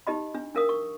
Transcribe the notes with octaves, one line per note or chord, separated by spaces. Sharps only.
D#4 G4 D#5 B5
D4
D4 A#4 F5 D#6
C#6